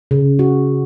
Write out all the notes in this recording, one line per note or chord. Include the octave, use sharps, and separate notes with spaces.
C#3
F#4